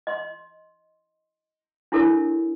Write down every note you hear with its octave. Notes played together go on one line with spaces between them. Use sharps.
D#5 C6
D4 E4 G4 A4 A#4 C#5